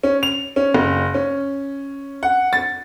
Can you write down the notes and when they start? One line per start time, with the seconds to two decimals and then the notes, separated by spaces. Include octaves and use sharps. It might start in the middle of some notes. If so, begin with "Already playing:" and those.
0.03 C#4
0.23 F7
0.56 C#4
0.74 F#1
1.14 C#4
2.23 F#5
2.53 A6